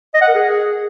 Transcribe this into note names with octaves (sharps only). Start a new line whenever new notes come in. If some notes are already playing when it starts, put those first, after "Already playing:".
D#5
F#5
A#4
G#4